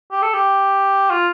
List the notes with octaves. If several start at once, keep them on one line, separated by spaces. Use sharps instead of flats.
G4
A4
G4
F4